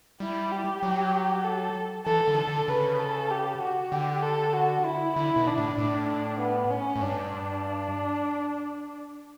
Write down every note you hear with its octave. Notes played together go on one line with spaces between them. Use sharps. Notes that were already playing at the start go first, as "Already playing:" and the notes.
G3 E4
G4
F#3
A4
E3 A4
D3
A4
D3
C#3 B4
A4
G4
F#4
D3 G4
A4
F#4
E4
D3 E4
B2
D4
A2
A2 D4
D4
B3
C#4
A2
G2 D4